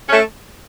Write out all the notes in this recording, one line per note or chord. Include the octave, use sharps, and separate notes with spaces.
A3 C#4